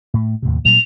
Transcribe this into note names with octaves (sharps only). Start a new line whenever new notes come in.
A2 A3
D#2 A2 C3
A#2 F#3 G3 F7